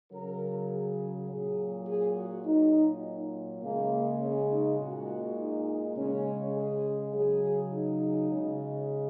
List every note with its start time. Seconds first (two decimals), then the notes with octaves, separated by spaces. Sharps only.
0.12 C#3 F#3 A#4
0.70 G#4
1.28 A#2 F#3 G#4
1.87 G#4
2.16 F#4
2.45 A#2 F#3 D#4
3.62 C#3 G#3 A#3
4.21 C#4
4.50 D#4
4.79 A#2 G#3 F#4
5.37 D#4
5.96 C#3 G#3 C#4
6.54 G#4
7.12 C#3 F#3 G#4
7.71 D#4
8.29 C#3 G#3